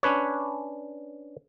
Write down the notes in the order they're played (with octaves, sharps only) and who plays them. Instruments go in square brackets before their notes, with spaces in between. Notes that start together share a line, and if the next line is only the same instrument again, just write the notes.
[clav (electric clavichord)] C#4 D4 B4 C#5